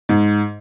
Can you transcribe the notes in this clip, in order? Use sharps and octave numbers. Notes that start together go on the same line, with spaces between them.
G#2